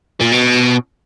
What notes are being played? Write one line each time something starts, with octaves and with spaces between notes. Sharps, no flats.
A#2
B2